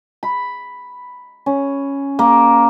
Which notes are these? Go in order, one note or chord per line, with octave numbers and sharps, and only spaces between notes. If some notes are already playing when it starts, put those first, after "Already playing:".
B5
C#4
A#3